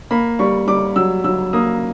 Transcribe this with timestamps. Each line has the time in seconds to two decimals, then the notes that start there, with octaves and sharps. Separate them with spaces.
0.11 A#3 B5
0.39 G3 C#6
0.67 G3 D6
0.96 F#3 E6
1.24 F#3 E6
1.53 A#3 D#6